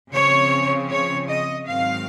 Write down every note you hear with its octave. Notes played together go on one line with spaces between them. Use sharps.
C#3 F3 C4 C#5
C#5
D#5
G#2 D#3 F#3 C4 F5